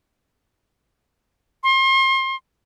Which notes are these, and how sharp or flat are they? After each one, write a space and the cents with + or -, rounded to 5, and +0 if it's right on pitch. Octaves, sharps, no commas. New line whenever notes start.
C6 +35